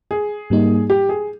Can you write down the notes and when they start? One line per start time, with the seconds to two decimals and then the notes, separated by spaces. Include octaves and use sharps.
0.11 G#4
0.50 G#2 G3 A#3 D#4
0.90 G4
1.09 G#4